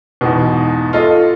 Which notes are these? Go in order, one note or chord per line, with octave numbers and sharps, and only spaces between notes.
E2 G#2 B2
F4 A4 D#5